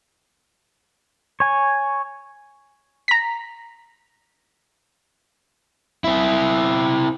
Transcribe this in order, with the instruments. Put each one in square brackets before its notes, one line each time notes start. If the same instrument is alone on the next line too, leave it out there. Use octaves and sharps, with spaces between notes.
[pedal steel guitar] C#5 G#5
[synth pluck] A#5 B6
[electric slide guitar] C4 E4